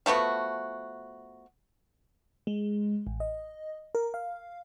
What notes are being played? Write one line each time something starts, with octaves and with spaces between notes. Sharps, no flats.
F3 A3 B3 F#4
G#3
A1
D#5
A#4
F5